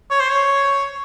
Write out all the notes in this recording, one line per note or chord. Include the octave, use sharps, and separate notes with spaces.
C#5
C5
C#5